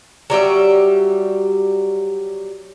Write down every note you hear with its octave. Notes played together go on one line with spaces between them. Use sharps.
F#3 G3 G4 E5